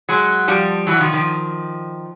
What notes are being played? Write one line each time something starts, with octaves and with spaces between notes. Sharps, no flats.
F#3 G#3
F3 G3
E3 F#3
D#3 F3
D#3 F3